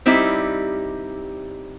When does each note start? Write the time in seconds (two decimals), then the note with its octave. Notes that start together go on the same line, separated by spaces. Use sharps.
0.06 G3 C4 D#4 E4 G4